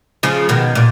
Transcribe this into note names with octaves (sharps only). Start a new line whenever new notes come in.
C#3 F3
B2 D#3
A#2